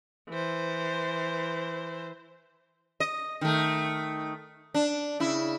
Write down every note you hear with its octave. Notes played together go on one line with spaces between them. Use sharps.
E3 C5
D#5
D#3 A3
D4
C#3 E4